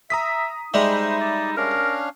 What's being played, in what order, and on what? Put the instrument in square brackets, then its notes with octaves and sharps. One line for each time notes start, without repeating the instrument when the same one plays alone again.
[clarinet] E5 [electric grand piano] A#5 D#6 B6
[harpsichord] G3 G#3 [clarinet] D#4 [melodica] C5 [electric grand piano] E5 B5
[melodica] D5
[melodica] C#4 D4 F5 [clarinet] A#4